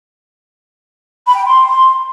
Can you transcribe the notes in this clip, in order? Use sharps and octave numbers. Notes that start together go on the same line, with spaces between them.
B5
G5
C6